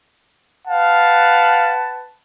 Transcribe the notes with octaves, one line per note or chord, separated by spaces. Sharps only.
B4 F5 F#5 A5